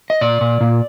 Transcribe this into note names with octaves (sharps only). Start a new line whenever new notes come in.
D#5
A#2 D5
A#2
A#2